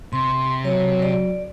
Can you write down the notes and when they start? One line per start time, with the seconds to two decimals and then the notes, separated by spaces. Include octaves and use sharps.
0.13 C3 C6
0.65 F#3 C#5
1.02 D5